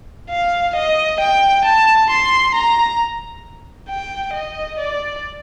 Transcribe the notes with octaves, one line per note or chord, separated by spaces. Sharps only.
F5
D#5
G5
A5
C6
A#5
G5
D#5
D5